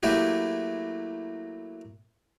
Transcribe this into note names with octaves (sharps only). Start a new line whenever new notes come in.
F#3 A3 A#3 E4 F#4 G4